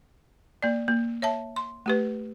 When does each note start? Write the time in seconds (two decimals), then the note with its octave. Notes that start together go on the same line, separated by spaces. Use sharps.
0.63 A#3 D5
0.88 A#3
1.22 C#5 E5 A5
1.56 C6
1.86 A3 G4 B4